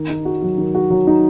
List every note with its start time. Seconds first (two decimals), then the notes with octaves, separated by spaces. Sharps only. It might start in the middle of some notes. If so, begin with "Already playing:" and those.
Already playing: D#3
0.10 D#4
0.25 F#4
0.42 F#3
0.58 D#3
0.75 F#4
0.90 F#3
1.07 D#4